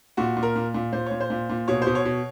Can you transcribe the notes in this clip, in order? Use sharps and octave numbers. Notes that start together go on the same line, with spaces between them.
A#2 F#4
A#2
A#4
A#2
A#2
A#2 C5
A#2 C#5
C5
A#2
A#2
B2 C#5
B2 C5
C#5
B2